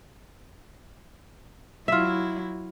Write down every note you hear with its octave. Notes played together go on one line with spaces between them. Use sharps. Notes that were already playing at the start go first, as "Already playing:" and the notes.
F#3 E4 F4 E5